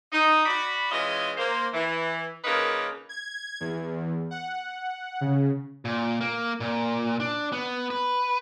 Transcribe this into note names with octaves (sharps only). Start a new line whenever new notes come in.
D#4
F#4 D5 B5
E3 G#3 C#4 F4 D#5
A#3 C5
E3
C#3 F3 A#3 D#4 A#4 B4
G#6
E2
F#5
C#3
A#2
A#3
A#2
D4
B3
B4